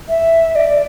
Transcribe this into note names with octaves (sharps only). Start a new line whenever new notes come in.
E5
D5